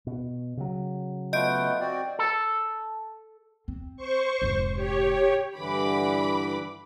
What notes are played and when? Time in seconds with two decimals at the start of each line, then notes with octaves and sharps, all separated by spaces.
0.07 B2
0.57 C#3 F#3
1.33 A3 B3 F4 D#5 G6 D7
1.80 C4 F#4 D5
2.19 A4
3.68 C4
3.97 C5 C#6
4.42 F1 G#2
4.75 G4 C#5
5.56 G2 D3 E3 B5 D6